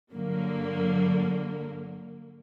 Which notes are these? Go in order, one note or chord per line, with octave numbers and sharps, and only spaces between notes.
G2 D3 F#3 A#3